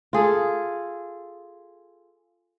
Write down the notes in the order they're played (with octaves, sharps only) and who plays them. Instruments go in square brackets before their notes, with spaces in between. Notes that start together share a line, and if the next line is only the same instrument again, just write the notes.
[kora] F4 G#4 A4